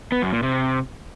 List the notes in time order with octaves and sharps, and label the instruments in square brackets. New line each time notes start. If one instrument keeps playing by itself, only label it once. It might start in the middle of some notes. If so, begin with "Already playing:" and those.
[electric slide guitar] B3
F#2
A#2
C3